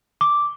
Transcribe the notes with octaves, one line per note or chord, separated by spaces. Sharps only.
D6